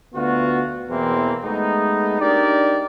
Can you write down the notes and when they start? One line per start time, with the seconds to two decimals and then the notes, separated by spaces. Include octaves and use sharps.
0.15 D2 B3 F4 F#4
0.89 E2 B2 E3 A#3 C4
1.44 G#3 A3 B3 D#4
2.20 D4 D#4 G4 A#4 D5